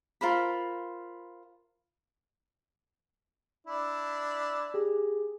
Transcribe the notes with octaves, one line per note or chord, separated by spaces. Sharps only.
F4 A#4 C5 B5
D4 E4
G4 G#4